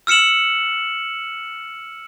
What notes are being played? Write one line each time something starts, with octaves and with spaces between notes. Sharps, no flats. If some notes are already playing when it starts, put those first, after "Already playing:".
E6 F6 C#7 E7 F#7